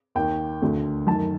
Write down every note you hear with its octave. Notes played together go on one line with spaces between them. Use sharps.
D#2 D#3 G5
D2 D3
F#2 D#3 A5